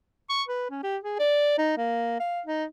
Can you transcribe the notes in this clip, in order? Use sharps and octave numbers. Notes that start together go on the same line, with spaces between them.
C#6
B4
C#4
G4
G#4
D5
D#4
A#3
F5
D#4